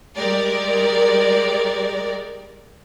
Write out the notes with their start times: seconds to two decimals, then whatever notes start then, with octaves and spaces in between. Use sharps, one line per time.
0.15 G3 G#3 G4 A#4 D5